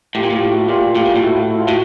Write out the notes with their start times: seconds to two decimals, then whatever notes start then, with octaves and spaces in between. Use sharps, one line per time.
0.15 A2 F4 G4
0.23 A#2
0.30 A2 F4 G4
0.51 E4 F#4
0.69 A#2 F4 G4
0.95 A2 F4 G4
1.05 A#2
1.15 A2
1.22 E4 F#4
1.50 E4
1.58 F4
1.68 A2 F#4